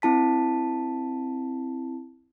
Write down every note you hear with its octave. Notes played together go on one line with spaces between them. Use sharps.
C4 E4 A5 B6